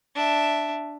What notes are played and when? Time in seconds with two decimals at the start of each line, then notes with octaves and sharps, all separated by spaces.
0.15 D4 E5